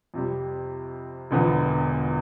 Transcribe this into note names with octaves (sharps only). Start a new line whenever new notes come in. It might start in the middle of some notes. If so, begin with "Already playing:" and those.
F2 C3 G3
E1 E2 D3 F3 B3